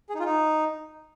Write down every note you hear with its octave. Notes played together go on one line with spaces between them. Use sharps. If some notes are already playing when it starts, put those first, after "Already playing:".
G#4
D#4
F4
D#4